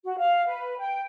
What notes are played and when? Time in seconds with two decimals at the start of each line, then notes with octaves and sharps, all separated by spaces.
0.04 F#4
0.18 F5
0.46 B4
0.79 G5